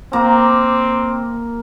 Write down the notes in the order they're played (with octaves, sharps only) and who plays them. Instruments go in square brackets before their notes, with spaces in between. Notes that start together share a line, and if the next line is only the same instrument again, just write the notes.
[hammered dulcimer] A#3 A#5 [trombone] C4